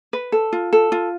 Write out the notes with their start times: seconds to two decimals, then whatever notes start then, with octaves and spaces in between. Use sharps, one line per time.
0.13 B4
0.32 A4
0.53 F4
0.73 A4
0.92 F4